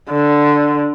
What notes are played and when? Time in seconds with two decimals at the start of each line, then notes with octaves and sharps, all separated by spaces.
0.10 D3